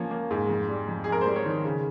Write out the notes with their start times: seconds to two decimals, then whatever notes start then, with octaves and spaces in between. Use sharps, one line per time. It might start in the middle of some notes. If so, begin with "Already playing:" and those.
Already playing: F3 A#3 C#4
0.11 A#3
0.31 G#2
0.49 F2
0.69 G3
0.88 F2
1.04 F2 G#4
1.12 A#4
1.21 G3 C5
1.36 C#5
1.46 D#3
1.65 C#3